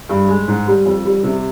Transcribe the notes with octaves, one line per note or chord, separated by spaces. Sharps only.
G2
G#3
G#2
G3
F2
G3
C3